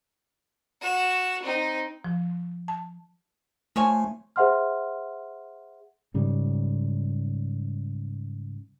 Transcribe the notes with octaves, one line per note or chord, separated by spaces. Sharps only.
F#4 E7
C4 D#4
F3
A5
F3 A3 C#5 G#5
G#4 C5 E5 F#5 C6 F6
G#2 C#3 G3